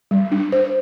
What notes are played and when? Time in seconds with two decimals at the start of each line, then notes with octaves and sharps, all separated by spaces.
0.11 G3
0.32 D4
0.52 C5